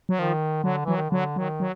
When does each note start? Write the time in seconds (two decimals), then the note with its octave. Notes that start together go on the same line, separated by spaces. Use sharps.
0.09 F#3
0.19 D#3 F3
0.64 D3 F#3
0.85 E3 F#3
0.96 D#3
1.10 D3 F#3
1.36 D#3 F#3
1.60 F#3